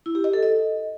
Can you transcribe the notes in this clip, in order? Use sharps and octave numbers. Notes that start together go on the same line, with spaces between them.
E4
G4
D#5
A4
D#5